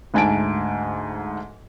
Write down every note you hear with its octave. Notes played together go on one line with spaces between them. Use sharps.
D2 G#2 G#5 A5 D7